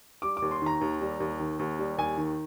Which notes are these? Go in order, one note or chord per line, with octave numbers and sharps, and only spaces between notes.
G3 D6
D6
D#2
C6
D#3 A#5
D#2
G3
D#2
D#3
D#2
G3
D#2 G#5
D#3